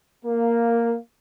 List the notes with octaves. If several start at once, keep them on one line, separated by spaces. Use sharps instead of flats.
A#3